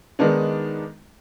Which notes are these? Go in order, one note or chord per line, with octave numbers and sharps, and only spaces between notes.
D#3 G#3 B3 D4 D#4